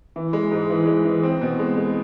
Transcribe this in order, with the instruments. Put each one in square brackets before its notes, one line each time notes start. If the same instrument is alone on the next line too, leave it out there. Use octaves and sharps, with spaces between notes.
[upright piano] E3
G#3
G#2
E3
G#3
E3
C4
B2
G#3
G#3